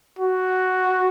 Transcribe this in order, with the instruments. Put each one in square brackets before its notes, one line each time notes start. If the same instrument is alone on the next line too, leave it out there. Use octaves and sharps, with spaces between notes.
[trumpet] F#4